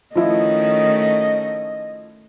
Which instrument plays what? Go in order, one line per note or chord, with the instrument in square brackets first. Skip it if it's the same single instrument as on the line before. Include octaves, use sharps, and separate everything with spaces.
[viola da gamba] D#3 A3 C#4 [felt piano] F3 E4 [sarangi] D#5